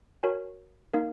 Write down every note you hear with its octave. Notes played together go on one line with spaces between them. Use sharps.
F#4 A#4 C#5 G#5
A#3 D#4 A#4 F5